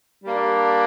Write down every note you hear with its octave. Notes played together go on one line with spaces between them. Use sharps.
G3 A#3 D4